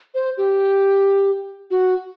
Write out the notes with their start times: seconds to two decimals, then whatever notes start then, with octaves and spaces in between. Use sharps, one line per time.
0.15 C5
0.37 G4
1.71 F#4